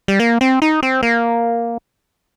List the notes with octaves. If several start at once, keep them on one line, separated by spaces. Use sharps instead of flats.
G3
A#3
C4
D#4
C4
A#3